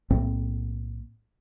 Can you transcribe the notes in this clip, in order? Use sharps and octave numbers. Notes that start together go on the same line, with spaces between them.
B1 A2 A#3 C4